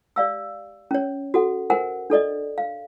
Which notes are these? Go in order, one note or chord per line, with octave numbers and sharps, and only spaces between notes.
G4 D5 F5 E6
C#4 C#5
F#4 A4 F#5
A#4 C5 F#5 G#5
D4 A4 D5 D#5
F5